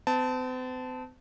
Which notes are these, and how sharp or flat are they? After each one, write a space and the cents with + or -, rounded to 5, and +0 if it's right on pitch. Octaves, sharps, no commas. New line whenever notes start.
C4 -45 A5 +0